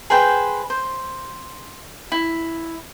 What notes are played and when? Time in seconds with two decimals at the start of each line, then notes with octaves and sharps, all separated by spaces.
0.10 G#4 B4 C5 G5
0.70 C5
2.12 E4